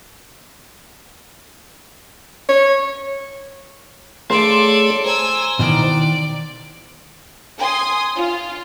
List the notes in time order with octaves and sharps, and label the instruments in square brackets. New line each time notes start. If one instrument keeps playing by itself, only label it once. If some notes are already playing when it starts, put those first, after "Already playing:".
[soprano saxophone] C#5
[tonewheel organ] A3 G#4 C#5 [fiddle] A4 D5 [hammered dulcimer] C6
[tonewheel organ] C5 A#5 [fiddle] G#5 E6
[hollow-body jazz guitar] B2 D#3 E3 [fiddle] D5
[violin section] G#5 C6 D#6
F4